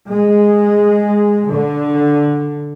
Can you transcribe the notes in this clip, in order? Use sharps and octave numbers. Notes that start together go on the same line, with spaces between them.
G#3
D3